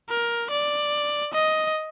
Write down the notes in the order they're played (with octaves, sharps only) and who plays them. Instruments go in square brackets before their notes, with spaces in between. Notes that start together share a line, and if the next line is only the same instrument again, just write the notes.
[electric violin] A#4
D5
D#5